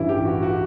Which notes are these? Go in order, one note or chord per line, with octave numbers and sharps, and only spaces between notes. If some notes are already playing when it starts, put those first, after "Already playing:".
Already playing: A1 G2 E3 E4
G4
F#4
F#4